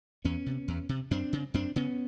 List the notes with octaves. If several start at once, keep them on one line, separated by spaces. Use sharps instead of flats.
E2 B3 C#4
C3
E2
C3
F#2 C4 D4
C#3
F#2 C4 D4
C#3 B3 C#4